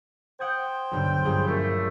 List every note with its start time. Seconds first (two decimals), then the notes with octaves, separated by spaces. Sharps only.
0.40 C5 F#5 G5 D#6 G#6
0.91 B1 G2 D3
1.25 A#1 G2 G#4
1.47 F#2 A3 G4